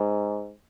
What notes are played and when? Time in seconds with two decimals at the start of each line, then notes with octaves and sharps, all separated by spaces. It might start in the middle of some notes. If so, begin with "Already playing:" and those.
Already playing: G#2